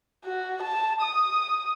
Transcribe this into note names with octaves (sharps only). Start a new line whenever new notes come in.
F#4
A5
D#6